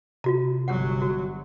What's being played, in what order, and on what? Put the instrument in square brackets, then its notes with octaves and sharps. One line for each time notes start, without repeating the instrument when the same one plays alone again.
[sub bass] C3 [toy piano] F4 F#4 A#5
[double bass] G1 F#3 [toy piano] F#5
[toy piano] F#4